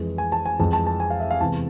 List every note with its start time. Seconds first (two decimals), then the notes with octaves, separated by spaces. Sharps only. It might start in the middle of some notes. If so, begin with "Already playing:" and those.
Already playing: F2 E3 G#3
0.18 G#5
0.32 A5
0.46 G#5
0.59 F2 E3 G#3 A5
0.73 A5
0.87 A5
1.00 G#5
1.10 F5
1.20 E5
1.31 F5
1.41 E2 C3 E3 G#3 A5